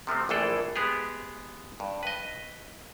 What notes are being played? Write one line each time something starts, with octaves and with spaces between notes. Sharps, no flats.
C3 F3 A3 C4
A#1 A2 E3 G#4 A4 G5
G#3 B3 G4 G#4
G2
B4 D#5